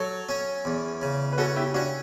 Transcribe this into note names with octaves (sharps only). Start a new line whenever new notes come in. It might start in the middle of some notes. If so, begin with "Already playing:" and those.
Already playing: F#3 A4 C#5
C#4
E2
C#3
B4
C#4 F#4 A4
E4 G4
C#4 D4 F#4